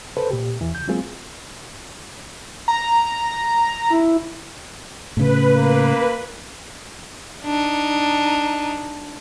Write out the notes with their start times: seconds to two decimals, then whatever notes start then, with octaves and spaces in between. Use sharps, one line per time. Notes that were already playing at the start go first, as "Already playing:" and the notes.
0.17 A4 B4 C5
0.31 A#2 G4
0.61 E2 E3
0.74 C#2 G6
0.88 F#3 G#3 A#3 C4 F4 G#4
2.68 A#5
3.90 E4
5.17 A2 C#3 B4
5.56 A#3
7.45 D4 D#4